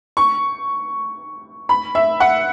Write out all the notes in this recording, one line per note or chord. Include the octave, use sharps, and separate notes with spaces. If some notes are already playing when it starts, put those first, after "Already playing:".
C#6
B5
E5
F#5